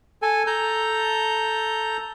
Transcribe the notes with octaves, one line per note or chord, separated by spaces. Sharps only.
A4 G#5
A4 A#5 G6